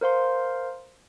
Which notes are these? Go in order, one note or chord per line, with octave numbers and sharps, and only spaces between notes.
A#4 C5 F5 C6